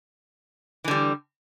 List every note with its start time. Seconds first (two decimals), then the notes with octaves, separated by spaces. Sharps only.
0.84 E3
0.88 D3
0.91 G3